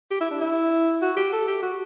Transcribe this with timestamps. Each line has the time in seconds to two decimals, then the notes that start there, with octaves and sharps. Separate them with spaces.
0.11 G4
0.21 E4
0.31 D4
0.41 E4
1.02 F#4
1.17 G4
1.33 A4
1.48 G4
1.63 F#4